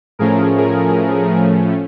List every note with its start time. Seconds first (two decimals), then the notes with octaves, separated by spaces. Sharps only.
0.19 A2 F3 A3 C#4 G#4 A#4
0.58 G#4 A#4